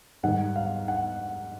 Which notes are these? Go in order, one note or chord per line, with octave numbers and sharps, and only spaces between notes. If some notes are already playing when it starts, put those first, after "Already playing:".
G#2 D#3 G3 F#5
F5
F#5